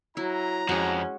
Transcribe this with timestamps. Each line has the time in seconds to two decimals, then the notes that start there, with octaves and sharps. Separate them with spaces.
0.17 F#3 E4 A#5
0.69 F2 G#3 C#4 F#4